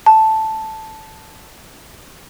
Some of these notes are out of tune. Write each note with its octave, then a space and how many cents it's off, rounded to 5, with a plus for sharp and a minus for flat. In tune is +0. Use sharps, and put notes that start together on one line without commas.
A5 +0